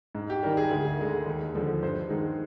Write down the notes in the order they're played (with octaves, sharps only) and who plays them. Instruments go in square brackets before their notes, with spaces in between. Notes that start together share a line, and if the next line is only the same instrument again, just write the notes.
[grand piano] G#2
G4
G3 A#4
D#3
G#4
D2 G#4
D3 G#3
D#2
D3 F3 G#3
G2 C5
D#3 G#3